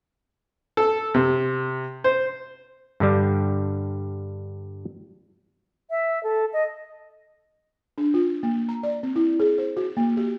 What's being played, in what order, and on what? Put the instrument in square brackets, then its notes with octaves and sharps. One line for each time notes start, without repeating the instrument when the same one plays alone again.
[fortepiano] A4
C3
C5
[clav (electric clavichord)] G2 D3 G3
[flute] E5
A4
D#5
[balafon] D4
F4
A#3
A#5
D5
C4
E4
G#4
C5
F#4
A#3
G4